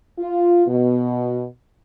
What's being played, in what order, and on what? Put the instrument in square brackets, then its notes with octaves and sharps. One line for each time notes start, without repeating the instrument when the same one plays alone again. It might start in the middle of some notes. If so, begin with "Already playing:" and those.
[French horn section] F4
B2